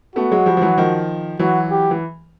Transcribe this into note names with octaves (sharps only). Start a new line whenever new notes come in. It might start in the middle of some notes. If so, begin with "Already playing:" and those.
A3 B3 F#4
F#3 G#3
F3 G3
F3
E3 F#3
D#3 F3
E3 F#3 F#4
G4
E3